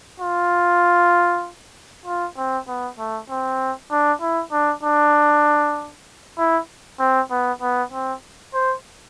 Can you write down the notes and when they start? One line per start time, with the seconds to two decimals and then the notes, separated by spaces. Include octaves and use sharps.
0.20 F4
2.05 F4
2.37 C4
2.68 B3
2.99 A3
3.30 C4
3.91 D4
4.21 E4
4.52 D4
4.83 D4
6.38 E4
6.99 C4
7.31 B3
7.61 B3
7.92 C4
8.53 C5